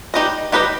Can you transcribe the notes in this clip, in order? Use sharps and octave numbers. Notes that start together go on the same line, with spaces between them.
G3 D#4 G4 B4 D#5
G3 D#4 G4 B4 D#5